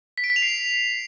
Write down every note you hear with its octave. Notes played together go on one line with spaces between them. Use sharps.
B6
D7
B6
F7
C7